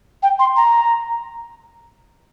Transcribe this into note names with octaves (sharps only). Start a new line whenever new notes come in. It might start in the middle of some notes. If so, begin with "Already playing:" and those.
G5
C6
A#5